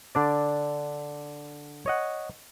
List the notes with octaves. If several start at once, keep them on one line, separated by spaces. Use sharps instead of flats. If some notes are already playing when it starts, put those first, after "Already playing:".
D3 D4 D5
C#5 D#5 F#5